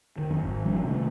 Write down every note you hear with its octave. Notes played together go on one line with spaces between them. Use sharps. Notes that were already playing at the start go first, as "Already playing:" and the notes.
D#3
F#2
G#1
F3 G3 C#4 D4
C3 D#3 A3